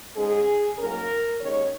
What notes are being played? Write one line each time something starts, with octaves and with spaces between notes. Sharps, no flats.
G#2 G#3 C#4 G#4
G#2 F#3 A#3 C#4 A#4
D#2 D#3 G#3 C#4 C#5